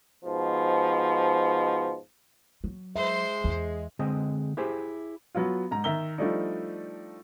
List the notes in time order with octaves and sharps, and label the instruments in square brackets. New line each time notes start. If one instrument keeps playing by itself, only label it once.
[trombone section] G#2 B2 F3
[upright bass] F#3
[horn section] G#3 [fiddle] C5 [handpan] E5
[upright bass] E2
[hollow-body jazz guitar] D3 G#3 C4 G#4 D#5
E4 G4 G#4 C5 E5
[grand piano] F#3 B3 F4
G#2 A#5
D#3 E5 A#5 E6 G7
F3 G3 A3 D4 D#4